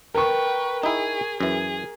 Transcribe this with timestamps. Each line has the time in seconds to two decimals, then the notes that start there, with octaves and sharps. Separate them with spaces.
0.15 A#4 B4 G5 C#6
0.83 D#4 E4 G#4
1.40 F#2 E3 G#4